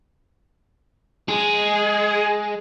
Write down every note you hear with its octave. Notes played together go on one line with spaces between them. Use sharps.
G#3 G#4